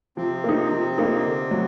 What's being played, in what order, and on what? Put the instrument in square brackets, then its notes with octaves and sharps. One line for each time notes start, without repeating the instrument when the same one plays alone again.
[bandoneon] C3 C4 [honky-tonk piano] F3
[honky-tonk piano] A#3 D#4
F3
A#3 D#4
D3
F#3